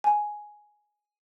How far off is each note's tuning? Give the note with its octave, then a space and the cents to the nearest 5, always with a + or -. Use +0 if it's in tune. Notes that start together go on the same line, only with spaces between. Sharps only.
G#5 +5